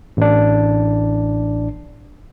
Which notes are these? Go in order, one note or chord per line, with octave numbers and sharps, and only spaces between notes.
A1 D4